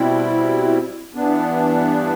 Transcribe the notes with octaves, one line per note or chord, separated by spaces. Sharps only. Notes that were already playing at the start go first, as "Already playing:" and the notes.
Already playing: B2 G3 C4 E4
G2 E3 B3 D4